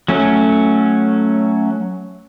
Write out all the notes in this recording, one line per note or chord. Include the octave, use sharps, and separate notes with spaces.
F#3 A3 C#4